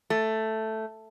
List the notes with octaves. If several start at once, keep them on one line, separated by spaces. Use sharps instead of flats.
A3